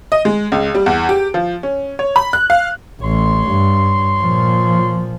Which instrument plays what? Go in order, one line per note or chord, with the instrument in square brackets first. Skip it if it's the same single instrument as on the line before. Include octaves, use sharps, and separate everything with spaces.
[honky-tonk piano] D#5
G#3
C#2
G3
E2
G4
F3
C#4
C#5
B5
F#6
F5
[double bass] A1 [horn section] C#5 C6
[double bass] G2
A#2 F3